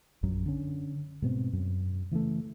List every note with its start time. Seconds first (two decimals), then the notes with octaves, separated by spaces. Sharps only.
0.23 A#1 F#2 F#3
0.46 D3 C#4
1.22 G#2 B2 C4
1.53 F#2
2.11 C#3 E3 F#3 A3